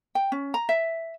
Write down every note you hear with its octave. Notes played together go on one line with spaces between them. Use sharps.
G5
C#4
A#5
E5